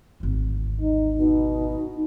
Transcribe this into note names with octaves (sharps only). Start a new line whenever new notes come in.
G#1 D2
D#4
B2 D#4